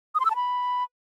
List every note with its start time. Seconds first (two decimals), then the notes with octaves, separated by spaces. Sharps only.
0.15 D#6
0.20 C6
0.25 E6
0.30 A5
0.36 B5